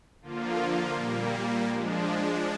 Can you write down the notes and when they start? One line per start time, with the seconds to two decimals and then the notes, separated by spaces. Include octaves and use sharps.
0.22 D3 F3 A#3 F4
0.95 A#2 G3 A#3
1.67 F3 G#3 D4